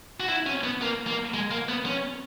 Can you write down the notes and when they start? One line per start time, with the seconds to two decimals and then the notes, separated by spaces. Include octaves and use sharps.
0.20 F#4
0.29 E4
0.46 C#4
0.64 B3
0.82 A#3
1.07 A#3
1.34 G#3
1.51 A#3
1.69 B3
1.86 C#4